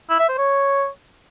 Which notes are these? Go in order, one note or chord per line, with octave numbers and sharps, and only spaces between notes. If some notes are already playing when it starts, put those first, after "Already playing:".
E4
E5
C5
C#5